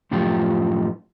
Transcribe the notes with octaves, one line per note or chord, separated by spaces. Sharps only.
F#2 A2 F3 F4 G4